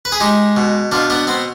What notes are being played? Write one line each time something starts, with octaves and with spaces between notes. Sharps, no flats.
B4
G#4
G#3 D#4 G4
B2
B2 D4 F4
B3 D4
B3 C4